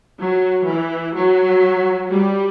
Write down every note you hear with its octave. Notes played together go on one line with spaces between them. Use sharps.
F#3
E3
F#3
G3